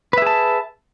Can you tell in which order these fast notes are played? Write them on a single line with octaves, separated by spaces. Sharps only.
B4 E5 G#4 A5